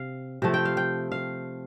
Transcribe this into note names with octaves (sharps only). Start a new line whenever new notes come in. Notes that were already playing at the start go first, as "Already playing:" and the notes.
Already playing: C3 F5
C3 F3 A3
G5
F5
G5
F5